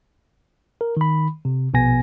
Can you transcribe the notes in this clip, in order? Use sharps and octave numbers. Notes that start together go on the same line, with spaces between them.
A#4
D#3 B5
C3
A#1 B2 B3 G#5 A#6